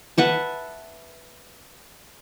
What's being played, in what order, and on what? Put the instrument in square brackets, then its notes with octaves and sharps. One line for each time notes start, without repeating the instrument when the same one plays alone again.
[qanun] B4 E5 F#5 A5